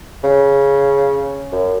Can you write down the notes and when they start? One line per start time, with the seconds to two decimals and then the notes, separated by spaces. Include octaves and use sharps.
0.24 C#3
1.53 F#2